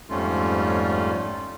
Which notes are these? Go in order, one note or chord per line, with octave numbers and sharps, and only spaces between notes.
F2 G#2 G3 A3 C#4 F4